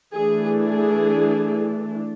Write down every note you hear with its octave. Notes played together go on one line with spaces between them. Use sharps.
E3 A3 D4 G#4
G#4